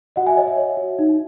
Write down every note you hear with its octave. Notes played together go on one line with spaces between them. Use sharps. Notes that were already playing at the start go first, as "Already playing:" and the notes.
F#4 D#5 F#5
E5 G#5
C#5 D#5
E5
C#5
F#4
D#4